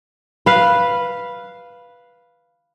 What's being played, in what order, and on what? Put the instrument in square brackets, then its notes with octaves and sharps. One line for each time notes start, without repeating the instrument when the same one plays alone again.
[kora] B4 F5